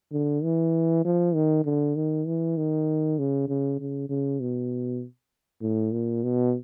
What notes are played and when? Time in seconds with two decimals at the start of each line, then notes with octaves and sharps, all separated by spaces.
0.12 D3
0.43 E3
1.05 F3
1.35 D#3
1.65 D3
1.96 D#3
2.26 E3
2.57 D#3
3.19 C#3
3.48 C#3
3.80 C#3
4.09 C#3
4.41 B2
5.62 A2
5.92 A#2
6.24 B2